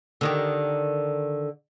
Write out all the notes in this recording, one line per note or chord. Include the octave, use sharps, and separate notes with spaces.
D3 D#3 G4